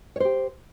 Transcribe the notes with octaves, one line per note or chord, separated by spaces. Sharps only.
G4 C5 C#5